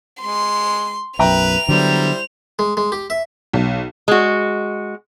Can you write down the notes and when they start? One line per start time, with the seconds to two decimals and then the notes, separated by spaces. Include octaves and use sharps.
0.22 G#3 C6
1.19 B1 F#2 B4 E5 G5 A#5 F7
1.69 D3 F#3 G3 B3 E4 C5
2.59 G#3
2.77 G#3
2.92 G4
3.10 E5
3.53 B1
4.08 G#3 F#4